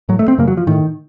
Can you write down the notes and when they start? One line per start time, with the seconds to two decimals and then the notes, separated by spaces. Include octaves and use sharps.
0.09 A2 F#3
0.19 A3
0.28 C4
0.38 F#2 C#3 A#3
0.48 F#3
0.57 F3
0.67 A2 D#3